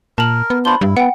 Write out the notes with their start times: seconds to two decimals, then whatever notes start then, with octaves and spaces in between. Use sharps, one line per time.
0.18 A#2 A#4 A5 F7 F#7
0.50 B3
0.65 D4 F4 C5 B5 G7
0.81 G2 E4
0.97 B3 F#5 G5